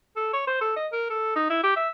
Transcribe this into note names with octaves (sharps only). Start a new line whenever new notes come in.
A4
C#5
C5
A4
D#5
A#4
A4
D#4
E4
G4
E5